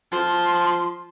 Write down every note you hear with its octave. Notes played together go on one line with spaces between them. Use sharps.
F3 C6